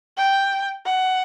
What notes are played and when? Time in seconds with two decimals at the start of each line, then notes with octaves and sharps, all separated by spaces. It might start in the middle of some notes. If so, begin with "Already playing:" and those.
0.18 G5
0.85 F#5